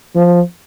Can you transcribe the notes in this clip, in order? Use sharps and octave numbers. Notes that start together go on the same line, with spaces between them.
F3